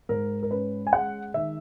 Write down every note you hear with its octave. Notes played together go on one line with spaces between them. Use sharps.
G#2 A#4
A#4
C#4 B4
G#5
G#3 F#5
D#3 E5